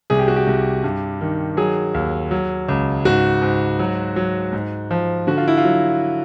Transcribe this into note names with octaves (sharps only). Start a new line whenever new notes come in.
C2 G#4
G4
F#4
G4
C2
G2
D#3
F#3 G#4
D#2
F#3
C#2
G#2 F#4
G#2
F#3
F#3
G#2
F3
D3 F#4
F4
E4
F4
F#3